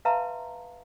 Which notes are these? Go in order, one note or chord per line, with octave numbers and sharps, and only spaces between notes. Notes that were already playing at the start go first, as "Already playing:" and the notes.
B4 E5 F5 A5 A#5 C6